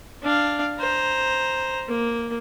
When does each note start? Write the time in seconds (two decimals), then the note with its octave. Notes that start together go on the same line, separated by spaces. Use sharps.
0.23 D4 F5
0.80 C5 A#5
1.88 A#3